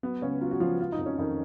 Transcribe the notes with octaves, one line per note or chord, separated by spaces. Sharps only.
F#3 B3
C#2 C#4
F#3 F4
F#4
C#2 F3 F4
F#3 F4
D#4
F2
C#4
F2 D#3 D#4